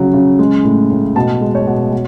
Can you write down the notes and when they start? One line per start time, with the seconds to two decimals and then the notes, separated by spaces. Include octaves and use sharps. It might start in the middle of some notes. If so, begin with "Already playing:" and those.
Already playing: C#3 F#3
0.14 C#3
0.39 G#3
0.64 A2
0.90 A2
1.16 B2 A5
1.41 G#3
1.55 C#5
1.67 B2
1.92 B2